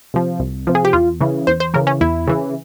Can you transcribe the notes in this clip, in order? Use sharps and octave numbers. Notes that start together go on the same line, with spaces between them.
C3 F3
C2
C3 F3
G#4
G4
E2 F4
C#3 E3
E2 C5
C5
C#3 E3 A#4
C#4
E2 E4
C#3 E3